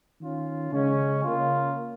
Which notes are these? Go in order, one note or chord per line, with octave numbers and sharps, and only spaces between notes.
D#3 C#4 F4
C#3 G#3 C#4
C#3 A#3 C#4 F4